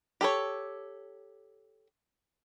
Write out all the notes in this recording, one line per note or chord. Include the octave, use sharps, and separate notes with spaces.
G4 A4 C#5